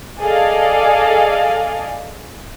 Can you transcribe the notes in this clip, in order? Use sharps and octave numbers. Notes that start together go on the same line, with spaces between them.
G#4 A4 D5 D#5 F5